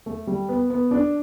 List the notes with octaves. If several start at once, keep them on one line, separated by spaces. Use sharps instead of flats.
A3
G3
B3
B3
D4